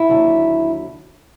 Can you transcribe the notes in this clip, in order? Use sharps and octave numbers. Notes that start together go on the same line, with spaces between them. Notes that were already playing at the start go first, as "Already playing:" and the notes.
Already playing: E4
D#2 D3 F#3